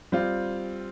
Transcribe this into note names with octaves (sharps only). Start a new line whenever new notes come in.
G3 C4 F4